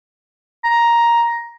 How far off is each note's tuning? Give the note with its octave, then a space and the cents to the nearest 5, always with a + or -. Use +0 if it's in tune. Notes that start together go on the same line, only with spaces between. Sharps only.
A#5 +10